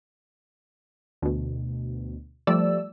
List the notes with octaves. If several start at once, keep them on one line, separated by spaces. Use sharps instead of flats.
D2 B2
F3 G3 A3 D5 E6